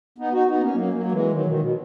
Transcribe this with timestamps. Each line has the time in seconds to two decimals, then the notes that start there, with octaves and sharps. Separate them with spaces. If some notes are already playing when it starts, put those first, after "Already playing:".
0.18 B3 D#4
0.32 D#4 F#4
0.47 B3 D#4
0.61 A#3 C#4
0.74 F#3 A#3
0.93 F#3 A#3
1.06 A#3
1.12 E3 G#3
1.32 D#3 F#3
1.46 B2 D#3
1.59 B2